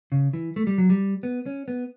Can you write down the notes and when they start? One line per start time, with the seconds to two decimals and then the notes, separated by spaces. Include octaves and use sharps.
0.12 C#3
0.33 E3
0.56 A3
0.67 G3
0.78 F#3
0.90 G3
1.23 B3
1.46 C#4
1.68 B3